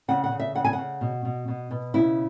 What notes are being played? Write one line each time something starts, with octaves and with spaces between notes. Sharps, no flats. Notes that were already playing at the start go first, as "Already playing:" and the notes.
C#3 F#5
F#5
C#3
E5
C#3 F#5
G#5
C#3 F#5
B2
B2
B2
B2
C#3 E4